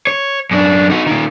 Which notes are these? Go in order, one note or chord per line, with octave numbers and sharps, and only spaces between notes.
C#5
F#2 D4
D#4 F#4
A#2 D#3